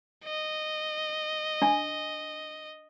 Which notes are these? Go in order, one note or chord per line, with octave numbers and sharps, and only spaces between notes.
D#5
D4 G#5